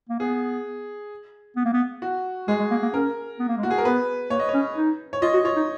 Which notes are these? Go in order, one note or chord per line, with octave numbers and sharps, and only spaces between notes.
A#3
B3 G#4
B3
A#3
B3
F#4
G#3 G#4
G#3
A#3
A#3
C#4 A#4
B3
A#3
G#3
F#4
A#3
G#4
A#4
B3 B4
A#3 C#5
D#5
C#5
C#4
D#4
C#5
F4 D#5
F#4
F4 C#5
D#4